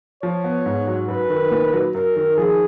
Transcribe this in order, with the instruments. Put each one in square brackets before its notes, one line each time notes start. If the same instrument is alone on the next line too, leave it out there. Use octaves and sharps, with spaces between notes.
[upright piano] F3 [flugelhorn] C#5
[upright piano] B3
G#2
F#3
[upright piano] F#2 [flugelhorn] B4
[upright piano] D#3
A#2
F#3
[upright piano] F#2 [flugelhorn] A#4
[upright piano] D#3
[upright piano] F3 [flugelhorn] G#4